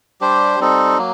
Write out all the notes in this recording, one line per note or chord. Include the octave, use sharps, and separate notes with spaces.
G3 D4 G4 C5
G3 C4 D#4 A4
F#3 A#3